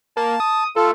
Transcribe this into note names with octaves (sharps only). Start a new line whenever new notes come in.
A#3 A5
D#6
A3 F4 A4